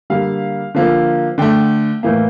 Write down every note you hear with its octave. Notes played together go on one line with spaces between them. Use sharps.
D3 G3 A#3 F5
D3 F3 A#3
D3 A3 G5
A2 E3 A#3